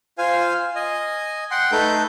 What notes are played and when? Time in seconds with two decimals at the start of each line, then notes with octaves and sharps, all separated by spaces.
0.18 F4 C5 F5 G#5
0.75 D#5 G#5
1.51 F#5 G5 C6
1.72 A3 D#4 A4 B4 G6